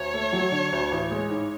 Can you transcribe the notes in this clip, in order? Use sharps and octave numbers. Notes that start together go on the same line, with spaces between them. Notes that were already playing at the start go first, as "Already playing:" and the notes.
Already playing: D2 C#5
A3
F#3
D3
D2
A1
G#3
G#2